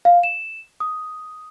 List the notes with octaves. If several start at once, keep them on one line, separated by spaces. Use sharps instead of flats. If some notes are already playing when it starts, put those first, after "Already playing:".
F5
E7
D#6